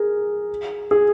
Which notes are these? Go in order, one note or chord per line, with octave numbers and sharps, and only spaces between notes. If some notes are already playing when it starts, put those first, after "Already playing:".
Already playing: G#4 A#4
G#4